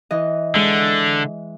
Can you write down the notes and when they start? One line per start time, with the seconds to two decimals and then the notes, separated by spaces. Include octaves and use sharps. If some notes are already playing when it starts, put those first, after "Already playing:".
0.11 E3 D#5
0.55 D3 G#3